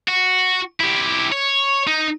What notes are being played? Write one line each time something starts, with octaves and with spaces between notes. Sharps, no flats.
F#4
E4 G4
C#5
D#4